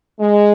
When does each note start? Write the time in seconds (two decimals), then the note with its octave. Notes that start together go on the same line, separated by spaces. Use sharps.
0.20 G#3